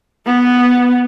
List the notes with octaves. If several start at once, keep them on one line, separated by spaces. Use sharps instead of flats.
B3